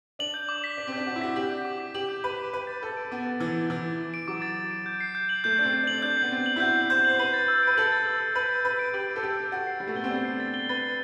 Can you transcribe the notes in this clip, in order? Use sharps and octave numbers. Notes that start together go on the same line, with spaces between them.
D4 F#7
G6
D6
B6
D4 F#7
C4
D4 G6
F#4 D6
E4
F#4 B6
G4 F#7
G6
D6
B6
G4 F#7
G6
B4 D6
B6
B4 D6
A6
A4 D6
D7
B3 D6
A6
E3 D6
D7
E3 D6
A6
D6
D7
F#3 D6
A6
D6
D7
G6
C7
G6
F#7
A3 G6
D4 C7
C4
G6
D4 F#7
D4 G6
B3 C7
C4 G6
F#7
E4
F#4 G6
C7
C5 G6
F#7
C5
B4 F#7
A6
E6
B4 D7
A4 F#7
A6
E6
D7
B4 F#7
A6
B4 E6
D7
G4 F#7
A6
A4
G4 E6
D7
F#4 A6
C7
G3 A6
A3
B3 G7
C4
D4 A6
C7
A6
G7
B4 A6
C7